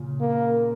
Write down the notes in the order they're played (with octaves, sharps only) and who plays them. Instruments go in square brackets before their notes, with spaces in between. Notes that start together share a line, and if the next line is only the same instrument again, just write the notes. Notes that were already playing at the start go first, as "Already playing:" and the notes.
Already playing: [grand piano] A#2 C#3
[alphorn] A#3